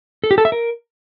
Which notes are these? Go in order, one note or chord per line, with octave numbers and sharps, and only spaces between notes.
A4
G4
A4
E5
A#4